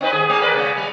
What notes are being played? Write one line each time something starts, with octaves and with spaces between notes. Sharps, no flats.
C4 D#4 B4
D#2 G#2 G#4
A3
A#4 B4 D5
C#3 G#3
G3